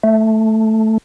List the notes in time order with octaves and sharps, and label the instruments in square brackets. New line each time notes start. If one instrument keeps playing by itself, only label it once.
[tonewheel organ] A3